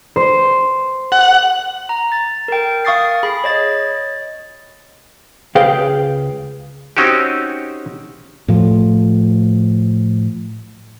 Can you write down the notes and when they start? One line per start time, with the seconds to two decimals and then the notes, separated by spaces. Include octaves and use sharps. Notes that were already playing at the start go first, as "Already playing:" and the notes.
0.16 C5
1.12 F#5
1.89 A#5
2.12 A6
2.48 A#4 G5
2.85 F5 C#6 D#6 A6 C7
3.23 G#4 B5
3.44 C#5 D#5 A6
5.55 C#2 G#4 B4 F5 G5
6.97 C4 C#4 D#4 F#4 G4
8.48 A2 F3